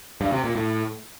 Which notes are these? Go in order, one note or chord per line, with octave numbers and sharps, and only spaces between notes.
G2
C3
A#2
A2